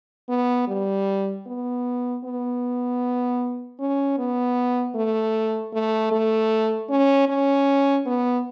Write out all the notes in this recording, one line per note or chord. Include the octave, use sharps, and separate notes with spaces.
B3
G3
B3
B3
C#4
B3
A3
A3
A3
C#4
C#4
B3